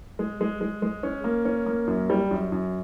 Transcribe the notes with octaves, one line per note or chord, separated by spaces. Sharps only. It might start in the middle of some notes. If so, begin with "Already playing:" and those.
G#3
G#3
G#3
G#3
C#4
A#3
C#4
A#3
F#2
G3
F#2
F#2